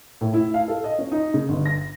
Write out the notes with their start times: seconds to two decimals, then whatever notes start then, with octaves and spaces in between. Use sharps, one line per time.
0.21 A2
0.34 E4
0.54 F5
0.68 A4
0.84 D#5
0.98 C#4
1.12 D#4
1.34 C#3
1.49 G1
1.66 A#6